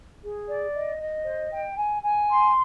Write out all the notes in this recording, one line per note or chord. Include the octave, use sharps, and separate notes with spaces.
G#4
D5
D#5
D#5
C5
G5
G#5
G#5
C6